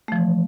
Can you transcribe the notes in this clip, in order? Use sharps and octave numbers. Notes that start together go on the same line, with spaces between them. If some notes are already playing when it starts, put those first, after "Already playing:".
E3 F3 A3